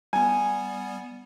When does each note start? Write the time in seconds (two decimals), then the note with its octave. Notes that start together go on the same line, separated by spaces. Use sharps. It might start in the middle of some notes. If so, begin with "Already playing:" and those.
0.13 G3 B3 G#5